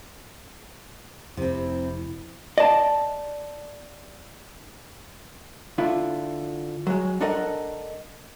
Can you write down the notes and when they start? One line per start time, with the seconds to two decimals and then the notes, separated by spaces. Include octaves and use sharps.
1.37 F1 C3 C4 E4
2.58 D5 D#5 A5
5.78 D3 E4 F4
6.87 F#3 G#3
7.21 D4 A4 A#4 D#5 F#5